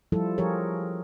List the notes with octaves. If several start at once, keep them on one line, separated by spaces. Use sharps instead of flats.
F3 G3 E4 F4 A4
F3 F4 G4 G#4 A#4 C#5